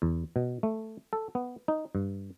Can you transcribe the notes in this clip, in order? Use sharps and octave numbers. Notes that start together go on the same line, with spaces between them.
E2
B2
A3
A4
B3
D#4
G2